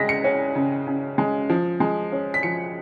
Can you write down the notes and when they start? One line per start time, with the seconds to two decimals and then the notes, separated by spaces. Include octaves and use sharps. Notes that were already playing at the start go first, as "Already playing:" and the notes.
Already playing: C#3 G#3 A#6 B6
0.09 C#7
0.24 C#4
0.55 C#3
0.87 C#3
1.18 G#3
1.50 F3
1.80 G#3
2.12 C#4
2.34 B6
2.43 F3 C#7